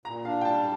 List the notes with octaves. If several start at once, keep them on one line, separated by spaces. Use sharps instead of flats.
A#2 A#5
D4 F5
G5
G3 A5